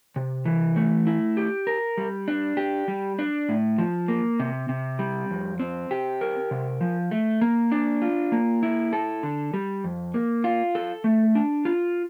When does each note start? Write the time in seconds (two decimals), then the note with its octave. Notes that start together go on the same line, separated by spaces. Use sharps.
0.16 C3
0.45 E3
0.76 A3
1.07 E4
1.37 G4
1.67 A#4
1.97 G3
2.28 D4
2.57 G4
2.88 G3
3.19 D4
3.49 A2
3.78 F3
4.08 A#3
4.40 C3
4.69 C3
4.99 G3
5.30 F2
5.60 C4
5.91 G4
6.21 A#4
6.51 C3
6.81 F3
7.11 A3
7.41 A#3
7.72 D4
8.02 F4
8.32 A#3
8.63 E4
8.93 A4
9.23 D3
9.54 G3
9.84 F2
10.14 A#3
10.44 F4
10.75 A4
11.04 A3
11.35 D4
11.65 F4